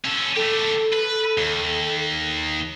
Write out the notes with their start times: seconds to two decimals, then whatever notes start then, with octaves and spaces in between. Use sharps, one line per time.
0.05 C#4 A4
0.36 A3 G4 A4
0.92 B4
1.38 D#2